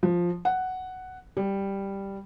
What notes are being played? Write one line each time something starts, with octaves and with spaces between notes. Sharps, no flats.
F3
F#5
G3